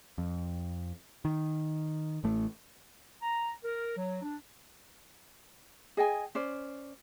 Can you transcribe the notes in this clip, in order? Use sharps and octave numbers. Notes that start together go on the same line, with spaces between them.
F2
D#3
A1 A3
A#5
A#4
F#3
D4
G#4 D#5 G5 G#5
C#4 C5 D5